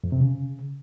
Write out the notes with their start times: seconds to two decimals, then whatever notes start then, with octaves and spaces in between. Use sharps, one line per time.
0.04 F2
0.12 C3
0.21 C#3